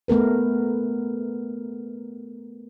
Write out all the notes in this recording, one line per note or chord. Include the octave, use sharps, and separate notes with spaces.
A3 B3 A#4 B4